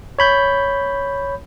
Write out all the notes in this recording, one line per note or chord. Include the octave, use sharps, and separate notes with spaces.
C#5 B5 G6